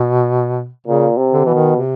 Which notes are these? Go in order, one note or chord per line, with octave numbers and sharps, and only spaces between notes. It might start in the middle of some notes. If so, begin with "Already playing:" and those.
Already playing: B2
A#2 C#3
C3
D3
B2 E3
D#3
C3